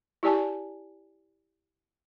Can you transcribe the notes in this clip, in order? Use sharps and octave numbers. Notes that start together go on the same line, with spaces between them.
E4 G4 D5 G#5 A5